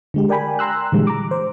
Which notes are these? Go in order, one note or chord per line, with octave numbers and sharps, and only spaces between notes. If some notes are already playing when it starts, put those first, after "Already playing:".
D3 G#3 G4
A#4 D5 G5 G#5 B5
G5 A#5 C6 E6 F#6
A#2 D3 E3 G3 G#3
A#5 D6
C5